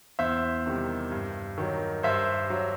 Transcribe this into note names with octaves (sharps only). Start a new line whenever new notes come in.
E2 C5 E5
C3 D#3 G3
G2
D#3 F#3
G2 C5 E5
F#3